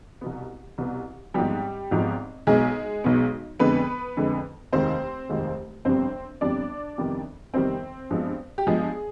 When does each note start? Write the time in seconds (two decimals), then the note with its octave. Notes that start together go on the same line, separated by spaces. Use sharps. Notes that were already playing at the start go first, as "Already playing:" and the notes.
0.21 C2 B2 B3
0.78 C2 B2 B3
1.34 G#1 G#2 F3 G3 B3 G4
1.91 G#1 G#2 F3 B3
2.47 B1 B2 G#3 B3 G#4
3.04 B1 B2 B3
3.60 F2 D3 G#3 B3 B4
4.17 F2 D3 G#3
4.72 F1 D#2 D#3 G#3 C4 C5
5.29 F1 D#2 D#3 G#3
5.85 G1 F2 C3 G3 B3 C4 C5
6.41 G1 F2 C3 G3 B3 D4 D5
6.98 F2 C3 D#3 G3 B3
7.54 F2 C3 D#3 G3 B3 C4 C5
8.10 G2 F3 G#3 B3
8.58 G4
8.66 G2 F3 G#3 B3 G#4